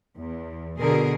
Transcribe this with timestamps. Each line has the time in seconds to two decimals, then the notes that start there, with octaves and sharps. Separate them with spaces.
0.18 E2
0.80 B2 D3 G#4 A#4